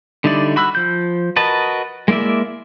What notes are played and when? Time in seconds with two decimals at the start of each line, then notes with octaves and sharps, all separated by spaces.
0.24 D3 G3 D#4 E4 D5
0.56 F#4 B5 E6 F#6
0.75 F3 G6
1.36 F#4 A#4 B4 D#5 A5
2.08 G#3 A#3 E4 D5 E5